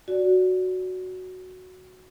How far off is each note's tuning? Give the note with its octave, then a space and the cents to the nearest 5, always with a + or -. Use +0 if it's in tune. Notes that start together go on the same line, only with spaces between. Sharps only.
F#4 +0 D5 -15